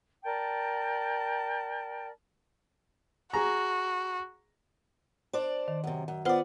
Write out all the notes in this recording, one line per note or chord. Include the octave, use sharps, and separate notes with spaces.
A#4 D5 G5 A5
F#4 G#4 A#5
D4 C5 D5
D#3
F#2 C3
F#2
B3 F4 C5 D5 F#5